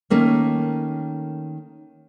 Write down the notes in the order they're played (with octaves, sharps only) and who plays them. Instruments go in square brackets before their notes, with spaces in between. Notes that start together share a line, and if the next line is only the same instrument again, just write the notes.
[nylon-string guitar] D#3 A3 A#3 C#4